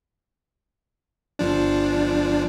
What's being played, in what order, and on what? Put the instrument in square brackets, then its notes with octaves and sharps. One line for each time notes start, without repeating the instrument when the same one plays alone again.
[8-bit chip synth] G1 F3 D4